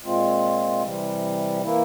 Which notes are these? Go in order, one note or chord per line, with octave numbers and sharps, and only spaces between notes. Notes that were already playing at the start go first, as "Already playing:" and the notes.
A#2 G#3 C4 F4
C3 E3 G3
E3 A#3 E4